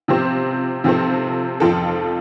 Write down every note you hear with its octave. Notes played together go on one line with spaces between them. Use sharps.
C3 F3 C4 G4 C5
C3 F3 C4 A4 C5
F2 F3 C4 A4